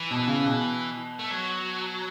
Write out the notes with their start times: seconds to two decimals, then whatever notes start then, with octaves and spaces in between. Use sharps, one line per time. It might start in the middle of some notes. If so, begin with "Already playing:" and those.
Already playing: E3
0.11 B2
0.27 C#3
0.45 B2
1.19 A3
1.30 F#3